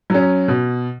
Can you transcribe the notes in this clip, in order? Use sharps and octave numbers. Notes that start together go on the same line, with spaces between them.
F#3 C#4
B2